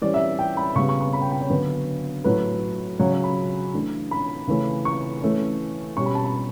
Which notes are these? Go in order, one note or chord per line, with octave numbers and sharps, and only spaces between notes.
E3 G3 C#4 D5
E5
G5
B5
C#3 G3 B3 C#6
C#6
C#6
B5
G5
G5
C#5
D3 F#3 B3 D4 B4
A2 F#3 A3 B4
C#3 F#3 C#4 C#5
C#5
B5
E3 A3 D4
B5
C#3 E3 A3 C#4
C#6
E3 A3 C#4
B2 G3 C#4 C#6
B5
A5
B5